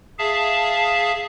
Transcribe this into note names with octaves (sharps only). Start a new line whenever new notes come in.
G#4 E5 F5 A5